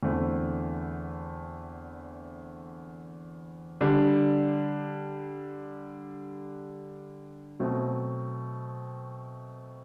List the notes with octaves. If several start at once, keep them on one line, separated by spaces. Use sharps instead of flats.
E2 D3 A3 C4 E4
D3 G3 D4
B2 F#3 A3 C4